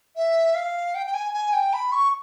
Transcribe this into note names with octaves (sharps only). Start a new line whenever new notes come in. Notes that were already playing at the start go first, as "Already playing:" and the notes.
E5
F5
G5
G5
G#5
G#5
G5
B5
C#6